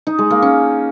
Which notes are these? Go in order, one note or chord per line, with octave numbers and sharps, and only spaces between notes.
D#4
G#3
A#3
C#4